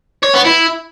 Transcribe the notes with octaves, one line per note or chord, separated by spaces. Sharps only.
C#5
B3
E4